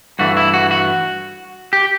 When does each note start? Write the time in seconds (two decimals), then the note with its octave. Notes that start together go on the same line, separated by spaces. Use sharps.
0.19 G2 E3 A3 F#4
0.37 E4
0.54 F#4
0.71 F#4
1.73 G4